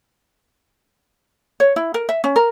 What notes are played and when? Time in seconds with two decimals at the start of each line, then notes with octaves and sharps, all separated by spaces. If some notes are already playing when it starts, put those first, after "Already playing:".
1.60 C#5
1.76 E4
1.94 A#4
2.09 E5
2.24 C#4
2.36 A#4